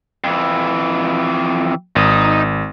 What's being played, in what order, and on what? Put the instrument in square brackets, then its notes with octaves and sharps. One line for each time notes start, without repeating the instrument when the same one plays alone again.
[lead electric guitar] F2 E3
[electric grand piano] G#1 [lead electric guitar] D#4 D#5